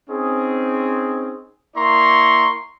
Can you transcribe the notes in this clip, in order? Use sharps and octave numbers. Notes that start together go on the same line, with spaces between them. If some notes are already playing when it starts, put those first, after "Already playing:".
C4 C#4 D#4 G#4
A#3 E4 D5 A#5 C6 C#6